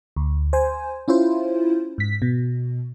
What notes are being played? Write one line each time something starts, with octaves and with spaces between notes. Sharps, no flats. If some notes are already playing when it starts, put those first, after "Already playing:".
D2
C5 G#5
C#4 E4 F4 C5
G#2 B6
B2